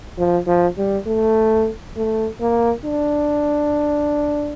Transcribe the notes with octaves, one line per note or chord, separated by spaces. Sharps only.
F3
F3
G3
A3
A3
A#3
D4